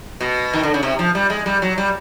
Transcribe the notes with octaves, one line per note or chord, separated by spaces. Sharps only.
B2
D#3
D3
C#3
C3
F3
G3
G#3
G3
F#3
G3